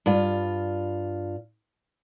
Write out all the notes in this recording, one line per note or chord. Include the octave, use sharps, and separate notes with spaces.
G2 F4